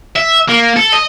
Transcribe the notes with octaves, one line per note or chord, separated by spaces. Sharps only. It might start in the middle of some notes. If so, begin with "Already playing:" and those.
E5
A#3
A4
D#5